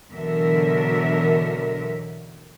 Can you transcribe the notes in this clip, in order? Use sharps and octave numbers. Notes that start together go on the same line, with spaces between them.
B2 D3 E3 F#3 A#4 E5